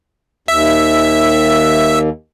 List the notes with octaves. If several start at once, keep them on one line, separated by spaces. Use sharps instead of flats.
D#2 E5